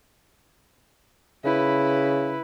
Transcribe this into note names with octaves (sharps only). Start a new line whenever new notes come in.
C#3 E4 B4